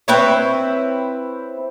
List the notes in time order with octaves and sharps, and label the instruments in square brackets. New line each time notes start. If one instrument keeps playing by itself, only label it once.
[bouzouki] C4 E4 B4 C#5